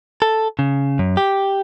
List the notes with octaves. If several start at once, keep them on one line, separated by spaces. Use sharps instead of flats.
A4
C#3
F#2
G4